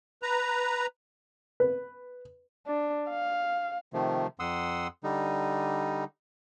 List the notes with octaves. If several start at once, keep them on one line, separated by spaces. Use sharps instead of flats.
B4 A#5
B4
D4
F5
C3 D#3 F3 A3
F2 F#5 C6 D#6 E6
D3 G3 D#4